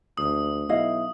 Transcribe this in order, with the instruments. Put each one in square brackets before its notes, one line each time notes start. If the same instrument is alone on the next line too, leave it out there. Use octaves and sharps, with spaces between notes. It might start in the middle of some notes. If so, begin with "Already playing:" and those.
[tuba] D2 [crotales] D#6
[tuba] B1 [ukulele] E4 D#5 F5